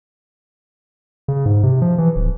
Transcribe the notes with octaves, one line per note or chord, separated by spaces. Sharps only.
C#3
G#2
C3
F3
E3
D1